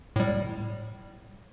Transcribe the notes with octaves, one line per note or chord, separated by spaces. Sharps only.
A2 G3